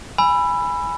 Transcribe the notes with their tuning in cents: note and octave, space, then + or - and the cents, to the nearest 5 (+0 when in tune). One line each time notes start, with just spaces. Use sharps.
G#5 -5 B5 +0 E6 +25